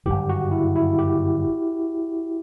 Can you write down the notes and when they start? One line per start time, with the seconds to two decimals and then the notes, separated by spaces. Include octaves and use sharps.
0.05 G1 F#2 D#3 G4
0.29 F#4
0.51 E4
0.76 E4
0.99 G4